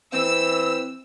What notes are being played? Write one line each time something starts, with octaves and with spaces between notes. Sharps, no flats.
E3 C4 E6